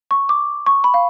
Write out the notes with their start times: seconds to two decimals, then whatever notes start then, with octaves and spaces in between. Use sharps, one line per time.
0.11 C#6
0.29 D6
0.66 C#6
0.84 B5
0.94 F5